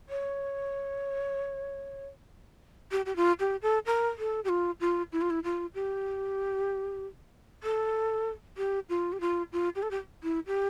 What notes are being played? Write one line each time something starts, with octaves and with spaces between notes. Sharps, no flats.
C#5
G4
G4
F4
G4
A4
A#4
A4
G4
F4
F4
E4
F4
E4
F4
G4
A4
G4
F4
G4
F4
F4
G4
A4
G4
E4
G4